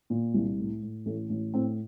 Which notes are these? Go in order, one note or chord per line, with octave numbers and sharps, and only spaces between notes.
A#2
C2
A2
A2
A1 A3
A1
A2 C4